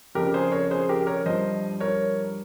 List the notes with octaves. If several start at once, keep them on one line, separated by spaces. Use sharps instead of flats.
F2 C#3 F3 G4 A#4
G#4 C5
A#4 C#5
G#4 C5
G4 A#4
A#4 C#5
G2 F3 C5 D#5
A#4 C#5